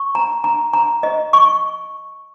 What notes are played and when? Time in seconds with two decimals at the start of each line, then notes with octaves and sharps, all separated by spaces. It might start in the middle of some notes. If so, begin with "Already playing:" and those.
Already playing: C#6
0.15 A#5
0.44 A#5
0.73 A#5
1.03 D#5
1.33 C#6